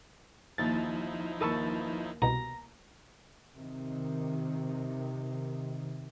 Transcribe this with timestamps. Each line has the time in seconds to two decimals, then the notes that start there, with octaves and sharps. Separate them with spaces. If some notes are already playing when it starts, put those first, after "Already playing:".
0.58 D#2 F3 D#4 E4 A6
1.40 D#2 A#3 B4 A5 C#6 E6
2.22 C2 B2 A#5
3.55 C3 D#3